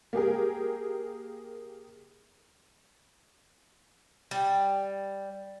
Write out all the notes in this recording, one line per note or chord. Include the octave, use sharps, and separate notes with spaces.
A#3 G4 G#4 A#4
G3